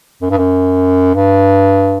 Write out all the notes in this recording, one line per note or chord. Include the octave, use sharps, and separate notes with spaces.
F#2
G2
F#2
G2